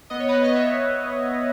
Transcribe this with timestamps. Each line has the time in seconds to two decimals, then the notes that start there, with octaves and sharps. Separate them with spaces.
0.10 B3 D#5
0.20 C#5
0.28 B3 B4 D#5
0.44 D#5
0.55 B3 C#5 E5